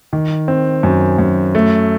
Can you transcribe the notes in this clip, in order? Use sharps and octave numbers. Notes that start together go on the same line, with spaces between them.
D#3
C4
F#2
F#2
A3